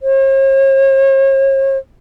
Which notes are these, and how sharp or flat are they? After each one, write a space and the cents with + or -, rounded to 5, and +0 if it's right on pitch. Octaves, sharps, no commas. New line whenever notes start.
C#5 -45